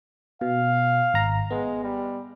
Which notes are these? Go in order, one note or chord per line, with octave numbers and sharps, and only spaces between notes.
B2 F5
G#1 A#5
G#3 B3
G3